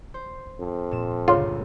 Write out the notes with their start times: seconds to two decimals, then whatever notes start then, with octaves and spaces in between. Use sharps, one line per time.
0.14 C5
0.59 F2
0.91 A#2 E7
1.28 G1 C#2 F4 G#4 C#5